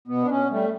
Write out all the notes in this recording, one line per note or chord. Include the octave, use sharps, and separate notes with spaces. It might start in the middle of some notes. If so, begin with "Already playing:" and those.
B2 B3
D4
C#4
G3 A3